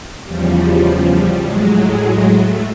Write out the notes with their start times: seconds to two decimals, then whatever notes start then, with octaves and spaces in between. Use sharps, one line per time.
0.24 E2 C#3 F3 G3
0.53 G3
1.11 G3
1.41 A2 F#3 G#3
2.28 A3